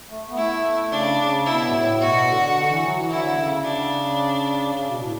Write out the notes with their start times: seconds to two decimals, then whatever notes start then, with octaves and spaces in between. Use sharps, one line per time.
0.09 A3
0.29 B3
0.37 A3 E4
0.92 C#3 D4
1.19 C#3
1.46 B2 E4
1.65 G#2
1.74 A2
2.01 B2 F#4
2.28 D3
2.55 D3
2.69 E3
2.83 F#3
2.96 E3
3.10 D3 E4
3.30 B2
3.38 C#3
3.65 D4
4.74 C#3
4.87 B2
4.99 A2